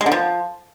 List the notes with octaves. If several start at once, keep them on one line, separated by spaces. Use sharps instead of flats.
G#3
D3
F3